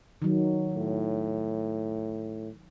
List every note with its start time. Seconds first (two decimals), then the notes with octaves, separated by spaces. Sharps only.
0.22 D#3 F#3
0.75 A2